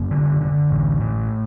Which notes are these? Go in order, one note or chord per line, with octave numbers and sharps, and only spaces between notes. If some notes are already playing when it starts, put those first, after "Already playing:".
Already playing: F#1 A#3
D3
D3
A1
A2